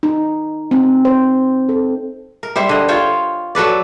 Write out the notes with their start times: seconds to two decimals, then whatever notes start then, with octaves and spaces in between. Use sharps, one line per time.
0.03 D#4
0.71 C4
1.05 C5
1.69 A4
2.43 A#4
2.56 G3 E4 C5
2.69 D3 D#5
2.88 F4 C5 C#5 G5
3.55 F#3 A4 B4 D5